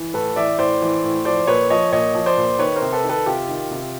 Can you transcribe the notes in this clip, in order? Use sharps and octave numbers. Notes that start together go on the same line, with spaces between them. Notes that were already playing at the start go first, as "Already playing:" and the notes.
Already playing: E3
A2 A4 B4
E3 D5 E5
A2 C5 D5
E3
A2
F3 C5 D5
A#2 B4 C#5
F3 C#5 D#5
A#2 C#5 D#5
F3
C5 D5
A#2
D#3 B4 C#5
A#4 C5
C3
A4 B4
D#3
A4 B4
C3 F4 G4
D#3
C3